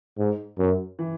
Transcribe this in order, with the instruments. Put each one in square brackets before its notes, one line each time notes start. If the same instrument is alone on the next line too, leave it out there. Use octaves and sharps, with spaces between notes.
[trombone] G#2
F#2
[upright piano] E3